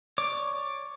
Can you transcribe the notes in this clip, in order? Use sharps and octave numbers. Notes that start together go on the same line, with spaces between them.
C#5 D5 D6